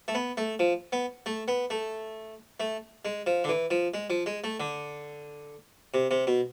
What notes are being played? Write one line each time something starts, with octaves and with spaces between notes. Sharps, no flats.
A3
B3
A3
F3
B3
A3
B3
A3
A3
G#3
F3
D3
E3
F3
G#3
F3
G#3
A3
D3
C3
C3
B2